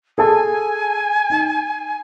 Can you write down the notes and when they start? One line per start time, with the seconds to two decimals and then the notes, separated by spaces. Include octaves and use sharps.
0.18 G#4 A4 G#5 A5
1.30 D#4